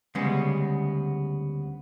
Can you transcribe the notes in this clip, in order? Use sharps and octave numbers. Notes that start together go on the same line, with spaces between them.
D2 C#3 G3 G#3 B3